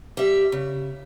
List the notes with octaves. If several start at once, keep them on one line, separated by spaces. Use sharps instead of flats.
G3 E5
C#3